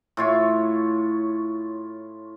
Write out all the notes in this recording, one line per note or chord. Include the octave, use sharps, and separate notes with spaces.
A2 F4 C#5